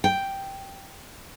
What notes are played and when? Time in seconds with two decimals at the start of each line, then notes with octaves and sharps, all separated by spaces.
0.04 G5